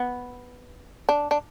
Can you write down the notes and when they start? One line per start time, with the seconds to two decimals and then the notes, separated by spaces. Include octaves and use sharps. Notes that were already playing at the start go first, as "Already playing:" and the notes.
Already playing: B3
1.09 D4
1.31 D4